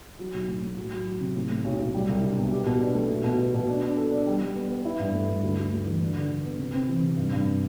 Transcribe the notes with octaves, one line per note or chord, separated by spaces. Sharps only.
F#3
B1
A2
A2
F#3
F#3
F#3
C3
A2
A2
B1
B1
G3
C2
D4
B2
G4
B2
D4
A3
B2
B2
B2
B2
D4
D4
A4
D4
G3
G3
B3
B3
E4
G2
A3
G2
D2
D2
D2
E3
D3
D3
D3
B3
C3
C4
E3
C3
G2
G2